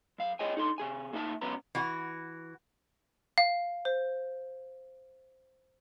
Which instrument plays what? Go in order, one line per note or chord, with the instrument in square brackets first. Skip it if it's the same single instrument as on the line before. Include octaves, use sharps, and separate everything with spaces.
[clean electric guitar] F#2 F5
G#4 C#5 D#5 G5 G#5
D#4 A4 C6
C3 G#4 G#5
A#2 A#3 D#4 C#5 E5 A5
C#2 F#2 B3 C#4 B4 A#5
[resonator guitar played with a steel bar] E3 F#4
[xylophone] F5
C5